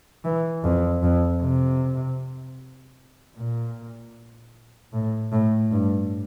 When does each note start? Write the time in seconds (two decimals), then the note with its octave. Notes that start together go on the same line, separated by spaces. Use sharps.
0.24 E3
0.64 F2
1.03 F2
1.41 C3
3.37 A#2
4.93 A2
5.32 A2
5.72 G2